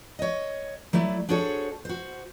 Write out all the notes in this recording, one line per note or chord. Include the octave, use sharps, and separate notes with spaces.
C#5 D#5
F#3 A3 E4 D5
D4 F#4 G#4 A4 C5 C#5
F#4 C5